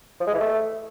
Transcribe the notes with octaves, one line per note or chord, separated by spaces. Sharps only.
F3
G#3
E3
A3